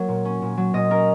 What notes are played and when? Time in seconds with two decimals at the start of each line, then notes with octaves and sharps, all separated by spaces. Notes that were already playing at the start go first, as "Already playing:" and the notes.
Already playing: F#3 A#3 A#4 C#5
0.08 A#2
0.25 C#4
0.42 A#2
0.57 F#3
0.73 A#2 D#5
0.90 C#4 A#4